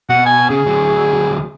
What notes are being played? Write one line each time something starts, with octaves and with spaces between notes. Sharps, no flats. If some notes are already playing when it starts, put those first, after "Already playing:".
B2 F#5
G#5
C#3 G#4
D2 F#3